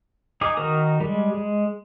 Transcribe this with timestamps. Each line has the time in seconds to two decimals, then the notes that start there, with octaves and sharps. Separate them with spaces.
0.41 D#4 G#4 D6
0.57 D#3 D#4 F#4 A#4 D#6
1.00 G3 G#3
1.34 G#3